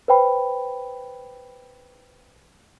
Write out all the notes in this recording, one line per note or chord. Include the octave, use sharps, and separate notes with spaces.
B4 C5 G5 B5